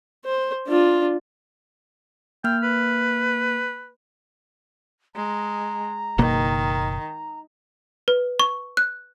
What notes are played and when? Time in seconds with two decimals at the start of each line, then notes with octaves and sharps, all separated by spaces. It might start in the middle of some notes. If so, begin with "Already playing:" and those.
0.25 C5
0.68 D4 F4
2.44 A#3 G5 F6
2.63 B4
5.15 G#3 A#5
6.18 F#1 B2 D#3 A#3
8.08 B4
8.40 C#6
8.77 F#6